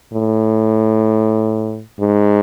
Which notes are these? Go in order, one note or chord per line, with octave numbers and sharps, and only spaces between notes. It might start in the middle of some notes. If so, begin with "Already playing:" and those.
A2
G#2